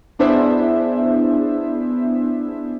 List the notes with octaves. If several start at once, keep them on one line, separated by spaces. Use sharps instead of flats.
B3 D4 E4 G#4 C5 E5